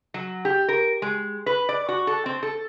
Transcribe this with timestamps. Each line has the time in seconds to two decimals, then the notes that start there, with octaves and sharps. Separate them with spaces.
0.14 F#3
0.45 G4
0.68 A#4
1.02 G#3
1.46 B4
1.69 D5
1.88 F#4
2.07 A4
2.26 C4
2.43 A4